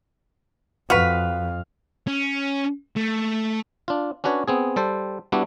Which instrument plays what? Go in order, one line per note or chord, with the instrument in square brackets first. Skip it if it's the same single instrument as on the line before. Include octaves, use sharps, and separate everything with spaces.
[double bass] F2 [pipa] F#4 B4 [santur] F5
[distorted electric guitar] C#4
A3
[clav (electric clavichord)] D4 F4
C#4 D4 F#4 B4 C#5
B3 C4 G#4
G3 A4 C5
G3 B3 D4 E4 F#4